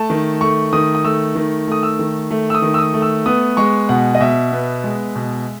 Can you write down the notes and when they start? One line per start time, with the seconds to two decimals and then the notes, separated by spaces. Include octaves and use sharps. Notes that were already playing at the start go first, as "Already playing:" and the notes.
Already playing: A3 A5
0.10 D#3
0.41 A3 C#6
0.73 D#3 D#6
0.95 D#6
1.04 A3 E6
1.35 D#3
1.67 A3 D#6
1.83 E6
1.99 D#3
2.30 A3
2.50 E6
2.54 D#6
2.62 D#3
2.74 E6
2.79 D#6
2.94 A3
3.02 E6
3.26 B3 D#6
3.57 G#3 C#6
3.89 B2 F#5
4.15 D#5
4.20 B2 E5
4.52 B3
4.84 G#3
5.15 B2